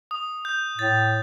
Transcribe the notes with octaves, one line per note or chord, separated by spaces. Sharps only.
D#6
G6
A2 A6